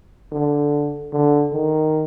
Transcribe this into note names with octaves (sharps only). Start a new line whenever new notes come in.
D3
D3
D#3